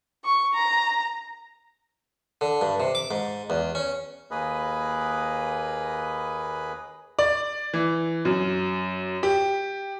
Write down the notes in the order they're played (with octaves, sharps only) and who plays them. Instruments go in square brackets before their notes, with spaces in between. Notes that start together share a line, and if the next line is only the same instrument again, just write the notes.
[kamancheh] C#6
A#5
[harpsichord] D3
G2
C3
D6
G#2
E2
C#4
[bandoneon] D#2 A#3 G#4 B4 D#5 B5
[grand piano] D5
E3
F#2
G4